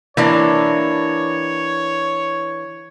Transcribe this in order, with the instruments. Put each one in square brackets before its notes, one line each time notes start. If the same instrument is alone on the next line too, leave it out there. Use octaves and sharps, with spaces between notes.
[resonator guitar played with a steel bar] E3 A#3 D4 [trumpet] C#5